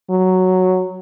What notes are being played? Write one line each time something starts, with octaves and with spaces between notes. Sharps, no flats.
F#3